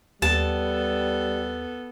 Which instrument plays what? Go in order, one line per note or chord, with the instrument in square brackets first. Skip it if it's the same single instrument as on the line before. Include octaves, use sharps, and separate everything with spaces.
[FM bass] D#2 [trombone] G3 [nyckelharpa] B3 A4 [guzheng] A5